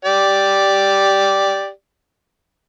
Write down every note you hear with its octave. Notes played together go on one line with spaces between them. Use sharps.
G4 D5